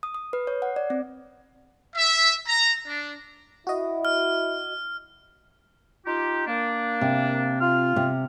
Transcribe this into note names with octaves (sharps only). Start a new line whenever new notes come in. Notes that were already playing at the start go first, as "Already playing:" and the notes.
D#6
D#6
B4
C#5
F#5
D5
C4
E5
A#5
D4
E4 F#4 D#5
F6
D#4 F4 G4
A#3 D4
C3
F4 F6
C3